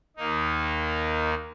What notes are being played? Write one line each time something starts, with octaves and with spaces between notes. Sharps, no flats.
D#2 D#3 A#3 D#4